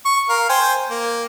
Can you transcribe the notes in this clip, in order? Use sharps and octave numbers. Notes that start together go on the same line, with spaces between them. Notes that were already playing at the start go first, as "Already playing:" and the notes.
C#6
A#4 F5
C5 G5 G#5
A#3